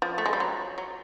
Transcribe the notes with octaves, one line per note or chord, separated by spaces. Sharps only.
F3
A3
G#3
G3
F#3
F#3